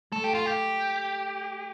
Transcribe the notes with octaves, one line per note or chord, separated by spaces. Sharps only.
A3 A4
G4
F4
G4